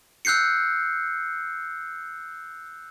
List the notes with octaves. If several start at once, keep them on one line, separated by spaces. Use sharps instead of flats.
E6 F#6 G6 C7 C#7